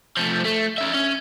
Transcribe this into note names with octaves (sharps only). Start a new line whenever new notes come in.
F3 A3
A3
C#4 E5
C#4